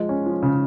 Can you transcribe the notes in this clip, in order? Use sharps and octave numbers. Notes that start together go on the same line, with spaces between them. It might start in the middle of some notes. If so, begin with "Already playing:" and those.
Already playing: F3 G#3
C#4
F3
C#3